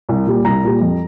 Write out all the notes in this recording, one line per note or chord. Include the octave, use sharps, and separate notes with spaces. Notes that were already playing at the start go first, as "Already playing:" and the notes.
C2
A#2 G3
C2 A#5
A#2 G3
F2